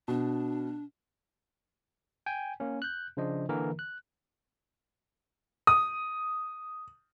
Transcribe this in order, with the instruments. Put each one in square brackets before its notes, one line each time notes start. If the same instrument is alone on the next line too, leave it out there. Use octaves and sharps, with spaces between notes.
[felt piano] B2 [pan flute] D4
[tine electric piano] G5 G#5
A#3 C#4
F#6 G6
C#3 F3 D4 C5 D#5
D3 E3 A#3 E4 A#4
F#6
[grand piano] D#6